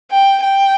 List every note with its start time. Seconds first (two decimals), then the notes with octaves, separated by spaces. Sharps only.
0.11 G5
0.44 G5